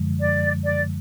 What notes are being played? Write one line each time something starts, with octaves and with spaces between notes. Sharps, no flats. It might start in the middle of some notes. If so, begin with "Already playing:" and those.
Already playing: F#2 D3 F3 G#3
D5
D5